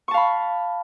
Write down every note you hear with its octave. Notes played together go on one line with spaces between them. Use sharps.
F5 A5 B5 C#6